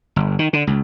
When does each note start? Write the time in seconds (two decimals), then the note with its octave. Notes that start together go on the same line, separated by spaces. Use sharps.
0.16 G1
0.39 D#3
0.53 D3
0.67 C#2